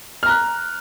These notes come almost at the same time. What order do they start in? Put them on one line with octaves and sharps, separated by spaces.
F6 A#5 F#6